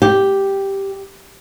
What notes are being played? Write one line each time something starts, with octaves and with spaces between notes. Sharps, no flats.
G4